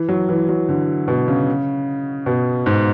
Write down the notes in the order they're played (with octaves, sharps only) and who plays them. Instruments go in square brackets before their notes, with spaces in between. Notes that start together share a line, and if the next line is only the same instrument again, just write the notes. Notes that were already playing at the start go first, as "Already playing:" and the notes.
Already playing: [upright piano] E3
F#3
E3
F#3
D3
B2
C#3
B2
G#2